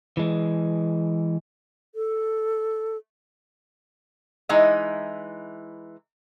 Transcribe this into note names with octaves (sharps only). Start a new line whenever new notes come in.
E3 G#3
A4
E3 G#3 D#4 E4 D#5